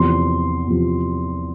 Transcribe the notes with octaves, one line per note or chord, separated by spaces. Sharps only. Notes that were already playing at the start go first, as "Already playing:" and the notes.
Already playing: E2 C3 F3 C4 C6
E2 C3 F3 C4